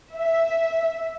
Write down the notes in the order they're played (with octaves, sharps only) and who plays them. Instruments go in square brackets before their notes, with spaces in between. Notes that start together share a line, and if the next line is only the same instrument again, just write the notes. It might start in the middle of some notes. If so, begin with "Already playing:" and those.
[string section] E5